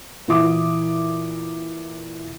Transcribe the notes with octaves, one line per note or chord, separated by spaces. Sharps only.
A#2 E3 E4 E5 D6 D#6